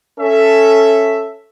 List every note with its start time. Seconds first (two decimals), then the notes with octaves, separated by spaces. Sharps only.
0.19 C#4 A4 E5